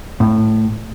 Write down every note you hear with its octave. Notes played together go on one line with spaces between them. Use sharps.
A2